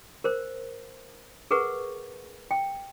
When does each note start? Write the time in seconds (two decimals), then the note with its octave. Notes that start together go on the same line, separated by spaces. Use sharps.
0.24 A#4 C5
1.51 G#4 A#4 B4 F#5 C#6
2.51 G5